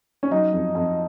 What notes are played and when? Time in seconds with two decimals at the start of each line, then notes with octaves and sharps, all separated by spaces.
0.23 C#4
0.31 F#3 D#4
0.53 F2
0.75 F2